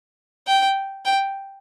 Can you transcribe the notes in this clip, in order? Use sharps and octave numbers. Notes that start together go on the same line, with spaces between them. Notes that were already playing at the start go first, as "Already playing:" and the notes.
G5
G5